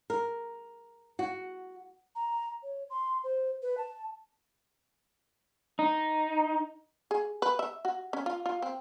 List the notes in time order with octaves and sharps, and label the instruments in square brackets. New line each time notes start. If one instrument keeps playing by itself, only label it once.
[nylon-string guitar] A#4
F#4
[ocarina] A#5
C#5
C6
C5
B4
A5
[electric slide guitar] D#4
[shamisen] G#4
B4
E5
F#4
C#4
F4
F4
C4